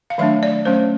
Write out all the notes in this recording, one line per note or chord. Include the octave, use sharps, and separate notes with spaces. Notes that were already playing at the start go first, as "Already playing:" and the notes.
F5
D#3 F#3 A3 D4 E5
D5
F#3 A3 C#4 C5